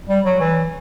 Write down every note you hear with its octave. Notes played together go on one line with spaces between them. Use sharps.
G3
F#3
E3